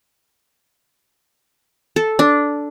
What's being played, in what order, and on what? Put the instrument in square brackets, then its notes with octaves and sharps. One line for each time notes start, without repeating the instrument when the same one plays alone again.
[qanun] A4
D4